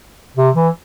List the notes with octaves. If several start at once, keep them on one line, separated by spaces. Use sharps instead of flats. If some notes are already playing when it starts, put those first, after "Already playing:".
C3
E3